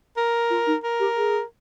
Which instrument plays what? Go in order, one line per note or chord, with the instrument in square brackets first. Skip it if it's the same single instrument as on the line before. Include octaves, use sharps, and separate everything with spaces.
[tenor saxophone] A#4
[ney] F4
D#4
[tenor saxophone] A#4
[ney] G4
G#4